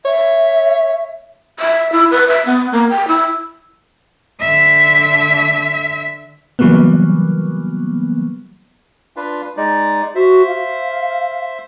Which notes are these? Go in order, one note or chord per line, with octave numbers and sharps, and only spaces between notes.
C#5 E5
E5
E4
B4
E5
B3
A#3
G5
E4
D3 E5
C#3 E3 F#3 G3 A#3 B3
D4 F4 B4
G#3 D#4 D5
F#4 C5 E5
F5